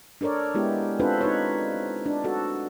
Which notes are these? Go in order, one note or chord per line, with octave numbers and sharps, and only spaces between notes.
D4 A4 A#4 C#5 D5
G#3 B3 E4 G4
C4 D4 F4 A4 B4 C5
D#4 B4 C#5
D4
F#4 A4